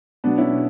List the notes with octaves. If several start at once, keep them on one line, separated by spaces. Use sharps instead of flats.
B2 F#3 B3 D4
C#4 E4
B2